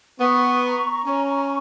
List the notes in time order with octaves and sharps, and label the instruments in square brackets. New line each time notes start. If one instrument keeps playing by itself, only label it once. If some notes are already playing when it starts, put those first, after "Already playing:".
[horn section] B3 [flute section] C#6
[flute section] A#5
[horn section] C#4 [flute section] C#6